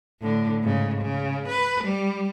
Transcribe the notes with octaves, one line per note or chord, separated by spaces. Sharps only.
A2 D3
G#2 C#3
C#3
B4
G3